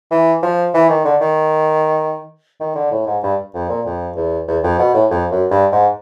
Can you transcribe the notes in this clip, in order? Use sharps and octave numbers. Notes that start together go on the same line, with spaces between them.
E3
F3
E3
D#3
D3
D#3
D#3
D3
A2
G#2
G2
F2
A#2
F2
E2
E2
F2
B2
A2
F2
F#2
G2
G#2